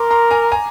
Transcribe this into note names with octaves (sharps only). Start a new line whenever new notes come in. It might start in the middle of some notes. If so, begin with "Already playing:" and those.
Already playing: A#4 C6 D6
A#5 C6
G#5 A#5
G#5 A#5